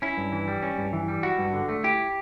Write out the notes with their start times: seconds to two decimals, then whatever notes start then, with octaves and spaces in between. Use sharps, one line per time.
0.02 C#4 E4
0.17 G2
0.32 E3
0.48 G3
0.62 C#4
0.78 G2
0.93 E3
1.08 G3
1.23 E4 F#4
1.38 G2
1.53 D3
1.69 A3
1.84 E4 G4